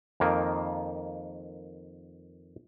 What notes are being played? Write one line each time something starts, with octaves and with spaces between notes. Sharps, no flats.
F2 D#3 A#3